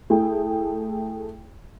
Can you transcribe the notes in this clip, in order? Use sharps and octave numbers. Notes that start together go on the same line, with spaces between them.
A3 E4 G#4 G5